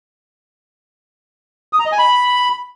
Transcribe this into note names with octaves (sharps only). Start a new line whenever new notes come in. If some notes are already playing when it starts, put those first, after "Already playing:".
D#6
A#5
D#5
G#5
B5